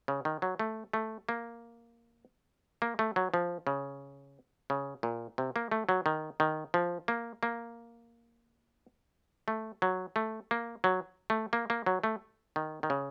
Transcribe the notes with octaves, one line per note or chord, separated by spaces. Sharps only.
C#3
D#3
F#3
A3
A3
A#3
A#3
A3
F#3
F3
C#3
C#3
A#2
C3
A#3
A3
F#3
D#3
D#3
F3
A#3
A#3
A3
F#3
A3
A#3
F#3
A3
A#3
A#3
F#3
A3
D#3
D#3
C#3